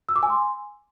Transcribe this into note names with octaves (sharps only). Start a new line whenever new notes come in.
E6
D6
G#5
C6